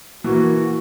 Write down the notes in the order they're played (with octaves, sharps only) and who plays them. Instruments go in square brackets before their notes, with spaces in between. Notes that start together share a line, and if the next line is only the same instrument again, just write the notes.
[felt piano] E3 A#3 [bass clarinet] F#4